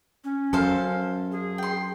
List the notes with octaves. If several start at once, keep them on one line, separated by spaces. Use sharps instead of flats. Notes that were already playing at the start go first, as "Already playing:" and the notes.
C#4
F#2 A4 C5 F5
G#4
G5 C6